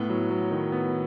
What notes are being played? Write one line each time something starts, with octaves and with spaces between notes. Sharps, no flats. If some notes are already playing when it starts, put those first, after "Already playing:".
Already playing: A2 B3
F#3
F#3
D#3
B3